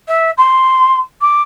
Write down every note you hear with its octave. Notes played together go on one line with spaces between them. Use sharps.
E5
C6
D6